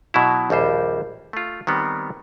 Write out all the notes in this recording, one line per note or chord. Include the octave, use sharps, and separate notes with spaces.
B2 F#3 E4
A#1 D#2 G3 C5
A3 F4
D#3 G3 B3 C4